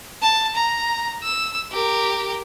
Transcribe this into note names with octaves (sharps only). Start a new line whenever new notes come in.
A5
A#5
E6
G4 A#4